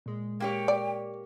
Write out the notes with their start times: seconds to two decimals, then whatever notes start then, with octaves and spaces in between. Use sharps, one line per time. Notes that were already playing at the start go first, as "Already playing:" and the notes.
0.06 A#2 G#3
0.40 A#3 G4 C#5 G5
0.68 D5